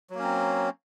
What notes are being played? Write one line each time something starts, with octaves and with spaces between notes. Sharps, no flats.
F#3 A#3 C4 C#4